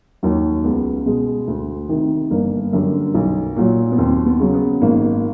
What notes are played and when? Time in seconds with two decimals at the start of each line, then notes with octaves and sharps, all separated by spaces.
0.23 D#2 D#3 F#3
0.64 C#2 B3
1.06 B2 G#3
1.48 D2
1.89 C3 D#3
2.31 G1 A#3
2.73 F#2 D3 G3
3.14 B1
3.56 A#2 F#3
3.92 B3
3.98 D#2 C4
4.26 B3
4.40 C#3 F#3
4.54 B3
4.82 G#1 A#3